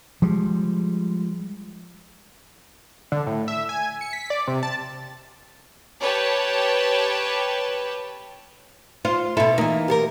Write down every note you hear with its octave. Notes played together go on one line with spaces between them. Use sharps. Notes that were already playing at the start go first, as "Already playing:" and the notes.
F3 G3 G#3
D3
A2
E5
G#5
C#7
B6
D5
C3
A5
G4 B4 C#5 G5 A5
F4 C5
B2 E4 A4
E3 A#3 D#4
G4 A4 A#4